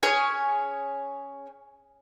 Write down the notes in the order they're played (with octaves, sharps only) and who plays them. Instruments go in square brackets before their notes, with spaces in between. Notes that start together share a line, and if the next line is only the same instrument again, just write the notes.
[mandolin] C#4 G#4 C#5 G#5